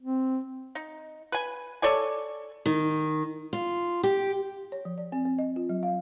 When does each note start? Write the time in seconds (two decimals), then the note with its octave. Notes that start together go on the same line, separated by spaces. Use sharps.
0.01 C4
0.75 D#4
1.32 B4 G#5
1.82 A4 C#5 D5 G#5
2.66 D#3
3.53 F4
4.03 G4
4.72 C#5
4.85 F3
4.98 D5
5.12 C4
5.25 C4
5.38 D#5
5.56 F4
5.69 F#3
5.83 F5